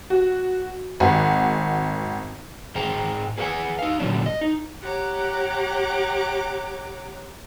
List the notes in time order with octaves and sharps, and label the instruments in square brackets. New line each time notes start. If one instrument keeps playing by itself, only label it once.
[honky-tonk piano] F#4
G#1 F#5
[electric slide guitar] G#2 G#3 G#4 C5 G5 A#5
G#4 B4 C5 F5 F#5 G#5
D#4 F5
A#2 D3 F#3 C#4 D4
D#5
D#4
[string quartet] G4 C#5 F#5 A#5 D6